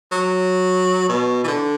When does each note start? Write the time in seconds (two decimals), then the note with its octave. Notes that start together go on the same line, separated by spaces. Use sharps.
0.12 F#3
1.09 B2
1.44 E3
1.48 D3